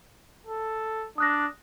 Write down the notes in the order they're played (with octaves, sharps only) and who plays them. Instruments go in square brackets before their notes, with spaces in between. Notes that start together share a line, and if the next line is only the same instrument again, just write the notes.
[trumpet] A4
[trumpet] D4 [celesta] D#6 F#6 A#6